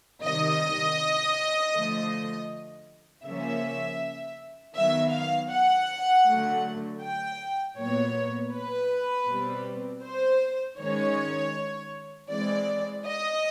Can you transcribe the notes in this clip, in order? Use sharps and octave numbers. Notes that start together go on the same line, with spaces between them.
C3 D#3 G3 D#5
D3 F3 A3
C#3 F3 A#3 C#4 E5
D#3 F#3 B3 E5
F5
F#5
D3 F#3 A3
G5
A#2 F#3 B3 C#5
B4
B2 G3 C4
C5
D#3 G#3 C#4 C#5
E3 G#3 C4 D5
D#5